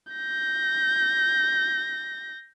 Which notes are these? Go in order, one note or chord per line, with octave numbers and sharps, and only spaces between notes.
G6 A#6